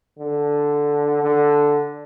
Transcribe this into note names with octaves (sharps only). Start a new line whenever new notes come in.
D3
D3